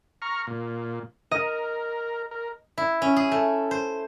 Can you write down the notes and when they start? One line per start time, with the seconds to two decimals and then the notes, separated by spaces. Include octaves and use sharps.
0.22 A#5 C#6 F6
0.47 A#2
1.31 A#4 D#5
2.31 A#4
2.78 E4
3.02 C#4
3.16 G#4
3.32 A3
3.71 C5